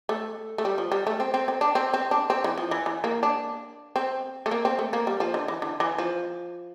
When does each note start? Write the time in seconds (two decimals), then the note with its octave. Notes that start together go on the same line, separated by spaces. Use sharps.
0.09 A3
0.58 A3
0.65 G3
0.78 F3
0.92 G3
1.07 A3
1.20 C4
1.34 C4
1.48 C4
1.61 D4
1.75 C4
1.94 C4
2.11 D4
2.30 C4
2.44 E3
2.58 F3
2.71 E3
2.86 E3
3.04 A#3
3.23 D4
3.96 C4
4.46 A3
4.51 A#3
4.65 C4
4.79 A3
4.93 A#3
5.07 G3
5.20 F3
5.34 D3
5.48 E3
5.62 D3
5.80 E3
5.98 F3